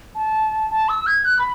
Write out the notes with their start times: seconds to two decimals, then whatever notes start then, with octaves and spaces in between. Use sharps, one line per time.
0.15 A5
0.71 A5
0.89 E6
1.07 G#6
1.25 F#6
1.39 B5